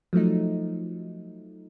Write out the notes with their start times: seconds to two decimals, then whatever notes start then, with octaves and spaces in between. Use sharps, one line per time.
0.13 F3 F#3 A3 D#4